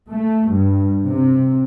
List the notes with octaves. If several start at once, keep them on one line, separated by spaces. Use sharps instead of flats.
A3
G2
C3